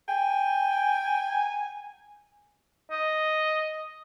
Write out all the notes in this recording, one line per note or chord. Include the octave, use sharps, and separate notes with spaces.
G5 G#5
D#5